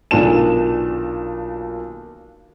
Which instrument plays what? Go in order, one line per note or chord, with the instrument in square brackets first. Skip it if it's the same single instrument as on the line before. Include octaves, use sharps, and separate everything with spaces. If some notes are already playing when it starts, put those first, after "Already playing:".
[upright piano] B1 A#2 D#3 D4 A5 E7